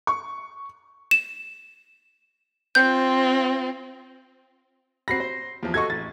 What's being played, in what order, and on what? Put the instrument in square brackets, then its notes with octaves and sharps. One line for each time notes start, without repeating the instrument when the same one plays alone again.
[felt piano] C#6
[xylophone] E7
[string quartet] C4 F4 [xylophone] G6
[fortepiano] C4 F#4 B5 [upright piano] A#6 C7
[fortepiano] C5
E2 F3
[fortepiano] F#4 A4 D#5 [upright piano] C#6 G#6
[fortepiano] A1 [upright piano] A6